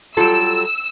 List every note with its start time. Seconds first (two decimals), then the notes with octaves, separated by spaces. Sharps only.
0.17 F#3 G3 F4 A4 G5 E6